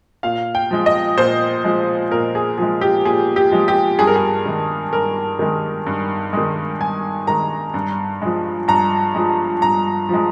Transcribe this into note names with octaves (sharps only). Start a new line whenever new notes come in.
A#2 F5
G5
F3 G#3
D#5
A#2 C5
F3 G#3
A#2 A#4
G#4
F3 G#3 G#4
G4
A#2 G#4
G4
F3 G#3
G4
G2 G#4
A#4
G#4
D#3 G#3
G2 A#4
D#3 G#3
G2
D#3 G#3
G2 G#5
D#3 G#3 A#5
G2
F3 G#3
G2 A#5
F3 G#3
G2 A#5
F3 G#3